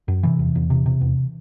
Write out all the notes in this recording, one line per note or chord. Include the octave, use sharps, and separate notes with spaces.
F#2
C3 E3
E2
E2
C3
C3
E2